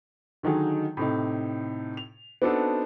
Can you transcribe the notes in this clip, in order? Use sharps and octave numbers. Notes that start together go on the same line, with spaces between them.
D3 D#3 F#3 D#4 G#4
A2 C3 D#4
F7
B3 C4 D4 D#4 F#4 A4